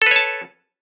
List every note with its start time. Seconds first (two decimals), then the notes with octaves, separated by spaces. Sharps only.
0.02 A4
0.06 B4
0.11 C#5
0.16 A5